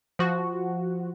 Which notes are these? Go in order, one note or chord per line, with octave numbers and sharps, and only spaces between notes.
F3 F#4